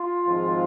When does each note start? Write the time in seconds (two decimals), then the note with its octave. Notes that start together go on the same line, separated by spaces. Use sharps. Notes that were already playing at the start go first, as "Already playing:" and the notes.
Already playing: F4
0.26 G#1 G#2 F3 C4